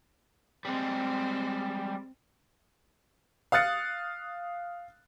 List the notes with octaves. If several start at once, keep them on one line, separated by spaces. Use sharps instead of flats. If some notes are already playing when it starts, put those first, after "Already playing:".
G3 G#3 C4
F5 D#6 F#6 A6 C#7